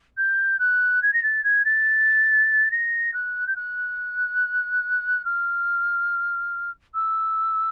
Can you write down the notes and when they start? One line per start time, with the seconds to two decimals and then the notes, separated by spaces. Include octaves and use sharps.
0.17 G6
0.59 F#6
1.02 G#6
1.13 A#6
1.23 A6
1.44 G#6
1.65 A6
2.71 A#6
3.13 F#6
3.47 G6
3.56 F#6
5.25 F6
6.94 E6